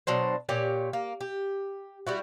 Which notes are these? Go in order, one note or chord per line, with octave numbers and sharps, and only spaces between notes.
B2 F#3 D4 C5
A#2 G4 C#5 G#5
A#3
G4
G3 E4 F#4